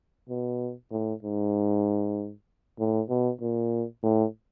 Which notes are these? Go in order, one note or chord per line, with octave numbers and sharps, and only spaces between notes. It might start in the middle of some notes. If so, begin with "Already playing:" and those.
B2
A2
G#2
A2
B2
A#2
A2